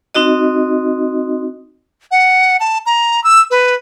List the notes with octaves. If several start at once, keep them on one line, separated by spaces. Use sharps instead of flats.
C4 D#4 F#4 D#5
F#5
A5
A#5
E6
B4